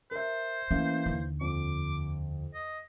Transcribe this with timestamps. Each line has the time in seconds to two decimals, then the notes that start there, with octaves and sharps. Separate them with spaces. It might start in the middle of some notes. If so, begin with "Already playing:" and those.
0.11 A#4 C5 E5
0.71 E3 A3 A#3 C#4 E4
1.06 D#2 D3
1.41 F2 D6
2.54 D#5